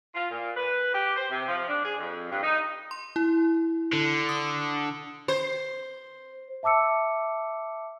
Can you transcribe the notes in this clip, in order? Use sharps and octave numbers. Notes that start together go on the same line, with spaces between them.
F4
A#2
B4
G4
C5
C3
F3
D4
G#4
F2
G2
D#4
C6
E4
D3
D#6
C5
E5 A5 D6 E6 C#7